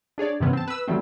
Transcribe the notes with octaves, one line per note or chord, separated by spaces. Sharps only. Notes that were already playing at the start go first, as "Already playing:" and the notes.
D4 G#4 C#5 D5
G2 C3 E3 B3 C#4
C4 A5
B4 E6
E3 F#3 G3 A3 C4